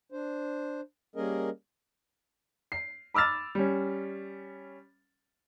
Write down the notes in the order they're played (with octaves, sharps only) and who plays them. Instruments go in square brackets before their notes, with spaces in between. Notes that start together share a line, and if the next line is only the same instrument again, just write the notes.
[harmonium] D4 C5
G3 A#3 C#4 G#4 A#4 D#5
[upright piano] C7
B5 D6 E6 F6 A6
G3 C#4